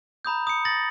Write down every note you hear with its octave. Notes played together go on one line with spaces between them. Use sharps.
A#5 B5 D#6 G6
D#6 C#7
A6 A#6 F#7